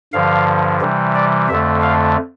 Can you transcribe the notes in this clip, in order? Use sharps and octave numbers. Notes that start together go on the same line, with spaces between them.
G2 D3 F3 F5
C3 E3 G3
D5
F2 D3 A3 E5
F5